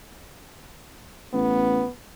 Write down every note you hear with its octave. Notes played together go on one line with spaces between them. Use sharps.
A1 B3